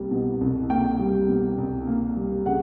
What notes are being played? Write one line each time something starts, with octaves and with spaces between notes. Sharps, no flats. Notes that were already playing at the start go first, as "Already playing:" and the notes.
Already playing: C2 G3 A#3
B2
C2
A#3 G5
G3
B2
C2
A#3
G3
C#3 F#5